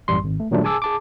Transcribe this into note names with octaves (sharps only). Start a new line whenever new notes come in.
A1 F#2 G3 C6
G#1
A3
A#2 D#3 F#3 G3 A3 D4
G#4 G#5 A5 D6 E6
G#4 A5 D6